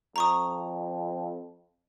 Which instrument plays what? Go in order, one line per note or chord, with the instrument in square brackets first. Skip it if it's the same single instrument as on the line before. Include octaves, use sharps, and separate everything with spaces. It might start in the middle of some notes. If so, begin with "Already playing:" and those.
[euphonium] F2 [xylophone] A#5 C#6 D#6